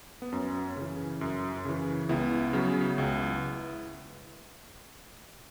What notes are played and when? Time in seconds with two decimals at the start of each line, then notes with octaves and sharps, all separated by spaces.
0.22 B3
0.32 F#2 C#4
0.77 C#3 E3
1.21 F#2
1.65 C#3 E3
2.09 C#2 B3 E4
2.53 C#3 F#3
2.98 C#2